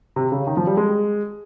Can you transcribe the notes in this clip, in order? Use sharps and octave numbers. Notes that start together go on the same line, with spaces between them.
C3
C#3
D#3
F3
G3
G#3